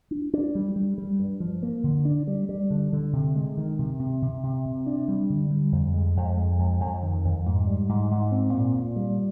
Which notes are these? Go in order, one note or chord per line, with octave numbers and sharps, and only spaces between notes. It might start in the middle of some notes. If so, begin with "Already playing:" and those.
D4
D4
G3
G3
G3
G2
F3
A#3
D3
D4
G3
G3
D3
D3
C3
G#3
D#3
C3
C3
C3
C3
C3
D4
G3
D3
G3
F2
G#3
F2
G#3
F2
F2
D#3
F2
G#2
G3
G#2
G#2
C4
A#2
A#2
G3